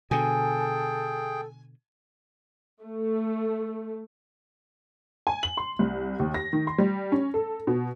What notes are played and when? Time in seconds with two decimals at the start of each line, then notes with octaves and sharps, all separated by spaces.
0.11 B2 D3 G#4 A4 G5 G#5
2.82 A3
5.27 G#5
5.43 F#7
5.57 C6
5.79 C2
6.19 D#2
6.34 A#6
6.53 D#3
6.67 C6
6.78 G3
7.12 C#4
7.34 A4
7.67 B2